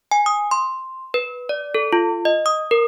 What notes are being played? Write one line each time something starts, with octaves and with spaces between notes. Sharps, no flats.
G#5
D#6
C6
B4
D5
A4
F4
D#5
D#6
A#4